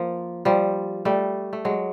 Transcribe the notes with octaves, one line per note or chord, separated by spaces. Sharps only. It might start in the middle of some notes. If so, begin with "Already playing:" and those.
Already playing: F3 A#3
F3 G3
G3 A3
A3
F#3 G#3